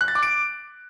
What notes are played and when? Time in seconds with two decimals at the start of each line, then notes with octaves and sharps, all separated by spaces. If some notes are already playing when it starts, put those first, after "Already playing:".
0.01 F#6
0.08 A6
0.15 D6
0.23 D7